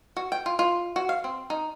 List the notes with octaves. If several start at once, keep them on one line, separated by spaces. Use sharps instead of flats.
F#4
G5
F4
F4
F#4
F5
C4
D#4